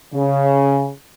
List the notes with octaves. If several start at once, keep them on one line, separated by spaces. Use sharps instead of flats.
C#3